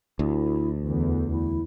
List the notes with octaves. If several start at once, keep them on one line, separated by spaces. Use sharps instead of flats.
D2 E4
E2 D3
E4